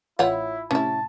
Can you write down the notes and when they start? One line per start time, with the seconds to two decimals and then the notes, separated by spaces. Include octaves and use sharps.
0.19 A1 E4 F4 C#5 F#5 G5
0.71 A2 C3 C#4 E4 A5